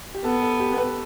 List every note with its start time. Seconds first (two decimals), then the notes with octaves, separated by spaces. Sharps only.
0.14 G4
0.24 B3 A4
0.42 A4
0.60 G4
0.78 B4